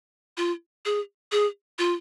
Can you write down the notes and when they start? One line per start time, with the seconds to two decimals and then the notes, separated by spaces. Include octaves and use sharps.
0.37 F4
0.85 G#4
1.32 G#4
1.79 F4